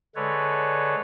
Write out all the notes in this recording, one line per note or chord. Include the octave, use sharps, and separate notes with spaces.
D3 G#3 A4 B4 C#5 D5